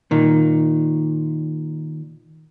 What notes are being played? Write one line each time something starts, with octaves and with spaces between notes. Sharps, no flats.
A#2 D#3